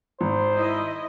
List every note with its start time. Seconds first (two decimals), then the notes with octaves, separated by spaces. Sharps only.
0.21 G#1 C5
0.54 E4 D#5